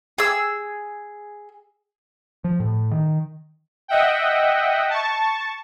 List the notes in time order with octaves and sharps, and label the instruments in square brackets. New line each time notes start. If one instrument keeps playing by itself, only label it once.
[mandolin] G#4 E6
[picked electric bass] F3
A2
D#3
[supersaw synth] D#5 E5 F#5 G5
A5 C#6